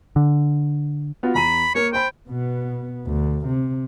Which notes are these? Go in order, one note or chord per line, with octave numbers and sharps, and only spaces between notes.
D3
B3 F4 F#4
E2 A#5 B5 D#7
A#3 A#4 C#5
C5 G5 B5
B2 B3
D2
C3